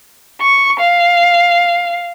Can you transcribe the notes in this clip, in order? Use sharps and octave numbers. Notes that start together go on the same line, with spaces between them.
C#6
F5